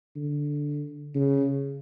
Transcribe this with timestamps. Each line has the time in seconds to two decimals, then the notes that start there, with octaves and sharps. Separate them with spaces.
0.16 D3
1.15 C#3